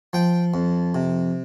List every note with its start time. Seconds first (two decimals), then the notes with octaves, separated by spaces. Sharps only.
0.13 F3 G5
0.54 F2
0.95 C3